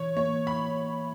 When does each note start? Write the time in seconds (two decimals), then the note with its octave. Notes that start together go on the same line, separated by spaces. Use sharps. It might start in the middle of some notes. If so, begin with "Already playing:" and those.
Already playing: E3 C#5
0.16 A#3 C#5
0.47 B5